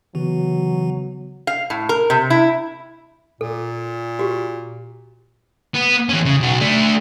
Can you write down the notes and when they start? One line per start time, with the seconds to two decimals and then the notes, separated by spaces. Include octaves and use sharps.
0.15 C#3 E3 F#3 B3 F#4
1.47 F5
1.70 A2
1.89 A#4
2.10 C3
2.30 E4
3.41 A#2 A4
4.19 F#4 G4
5.75 B3
6.09 E3 C#4
6.25 C#3
6.40 B1 F#4
6.61 A3 D4